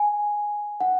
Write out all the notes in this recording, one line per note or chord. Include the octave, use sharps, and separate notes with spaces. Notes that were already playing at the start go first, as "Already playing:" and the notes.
Already playing: G#5
F#5